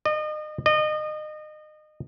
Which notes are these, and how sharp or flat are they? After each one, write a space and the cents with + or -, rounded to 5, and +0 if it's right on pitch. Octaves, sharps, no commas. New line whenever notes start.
D#5 -35
D#5 -30